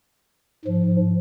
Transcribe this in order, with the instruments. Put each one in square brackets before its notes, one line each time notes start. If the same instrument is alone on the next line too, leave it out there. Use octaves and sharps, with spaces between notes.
[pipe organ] G#2 F3